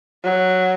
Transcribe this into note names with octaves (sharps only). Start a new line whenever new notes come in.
F#3